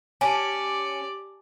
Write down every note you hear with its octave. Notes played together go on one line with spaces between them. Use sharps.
C#4 G4 D5 G#5 A5